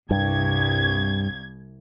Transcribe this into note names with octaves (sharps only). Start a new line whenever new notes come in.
C2 G2 G#6